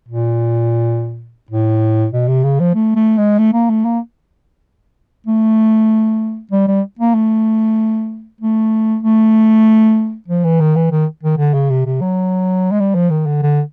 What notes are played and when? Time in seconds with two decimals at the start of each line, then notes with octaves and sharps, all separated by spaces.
0.09 A#2
1.50 A2
2.13 B2
2.28 C3
2.44 C#3
2.60 F3
2.75 A3
2.96 A3
3.18 G#3
3.38 A3
3.53 A#3
3.70 A3
3.85 A#3
5.26 A3
6.51 G3
6.67 G3
6.99 A#3
7.15 A3
8.41 A3
9.03 A3
10.28 F3
10.44 E3
10.60 D#3
10.76 E3
10.91 D#3
11.23 D#3
11.38 D3
11.54 C#3
11.70 C3
11.85 C3
12.01 F#3
12.71 G#3
12.80 G3
12.95 F3
13.10 D#3
13.26 D3
13.42 D3